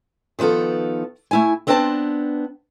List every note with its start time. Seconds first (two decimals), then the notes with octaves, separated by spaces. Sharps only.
0.39 D#3 F3 B3 F4 A4
1.31 A3 E4 G#5
1.67 B3 C4 D4 C5 G5 A5